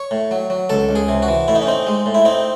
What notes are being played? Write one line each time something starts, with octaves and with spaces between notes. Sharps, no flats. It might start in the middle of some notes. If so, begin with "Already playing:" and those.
Already playing: C#5
A2
F#3
F#3
C#2 A4
C#2
G#4
C3
F#4
E3
A2 E4
D#4
C#4
C4 D#4
G#3
A2
E4
C4 D#4